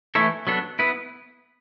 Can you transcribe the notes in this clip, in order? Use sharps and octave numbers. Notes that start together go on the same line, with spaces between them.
E3 A3 E4 A4 C#5
F#3 B3 D4 A4
B3 E4 B4